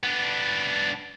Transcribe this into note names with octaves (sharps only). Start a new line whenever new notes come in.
B3 D4